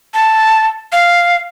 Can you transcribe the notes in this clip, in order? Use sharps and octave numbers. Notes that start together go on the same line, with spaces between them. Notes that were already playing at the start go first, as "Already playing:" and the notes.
A5
F5